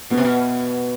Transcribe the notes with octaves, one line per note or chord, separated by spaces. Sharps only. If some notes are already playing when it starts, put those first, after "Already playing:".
B2 B3
C3
B2